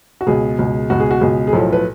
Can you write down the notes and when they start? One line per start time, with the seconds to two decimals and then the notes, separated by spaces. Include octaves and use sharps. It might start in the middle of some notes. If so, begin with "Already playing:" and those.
0.21 F#4
0.27 C#2 B2 G#4
0.59 C#2 B2
0.90 C#2 B2 F#4
1.00 G#4
1.11 F#4
1.21 C#2 B2 G#4
1.47 G#4
1.53 B1 A2 F3 A4
1.73 B4